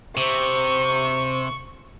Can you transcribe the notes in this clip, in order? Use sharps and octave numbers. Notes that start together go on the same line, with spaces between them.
C3 C5 C#6